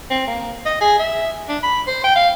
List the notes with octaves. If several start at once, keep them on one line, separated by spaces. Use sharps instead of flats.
C4
A#3
D#5
G#4
E5
D4
B5
C5
G5
F5